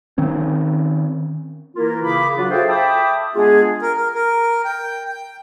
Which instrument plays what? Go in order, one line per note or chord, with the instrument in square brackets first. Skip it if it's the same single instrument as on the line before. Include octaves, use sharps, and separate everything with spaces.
[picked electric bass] D#3 C4 C#4
[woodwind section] E3 A#3 E4 F4 A#4
C#3 B5 D6
F#3 D4 F4 F#4
G#4 A4 C5 E5 F5 G5
E5 G5 A5 B5 D6 D#6
G#3 B3 D4 F4 G#4
[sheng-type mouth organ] A#4
A#4
A#4
G5
G5